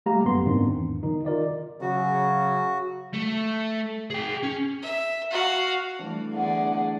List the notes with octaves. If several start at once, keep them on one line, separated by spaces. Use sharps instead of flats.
G3 A3 A#3 G4 F5 A#5
A1 F#2 B3 C6
G#2 D#3 C4 D4
E2
D#3 D#4
F4 A#4 D5 D#5
C#3 F#3 F#4
A3
G#4 G5
C#4
E5
F#4 F5
E3 G3 A3 D4
E2 D3 A3 G#4 D5 F#5